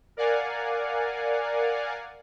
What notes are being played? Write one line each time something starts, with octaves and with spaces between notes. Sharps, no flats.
A#4 D5 F5 F#5 G#5